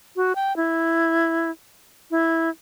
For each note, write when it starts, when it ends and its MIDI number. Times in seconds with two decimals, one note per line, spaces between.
0.16 0.33 66
0.35 0.55 79
0.57 1.51 64
2.11 2.49 64